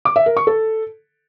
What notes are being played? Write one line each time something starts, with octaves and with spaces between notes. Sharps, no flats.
D6
E5
A#4
C#6
A4